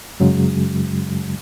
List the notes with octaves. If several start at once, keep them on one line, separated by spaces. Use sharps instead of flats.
F#2 C#3 F#3 G#3